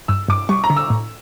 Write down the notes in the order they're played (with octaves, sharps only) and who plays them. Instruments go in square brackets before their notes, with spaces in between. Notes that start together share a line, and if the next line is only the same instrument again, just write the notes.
[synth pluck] G2 [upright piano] E6
[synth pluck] G2 [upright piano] D6
[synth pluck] G3 [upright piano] C#6
[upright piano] A#5
[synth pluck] D3
[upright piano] E6
[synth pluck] A2